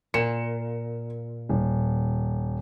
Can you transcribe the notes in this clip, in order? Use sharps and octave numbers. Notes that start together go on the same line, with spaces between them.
A#2 C#7 E7
D#1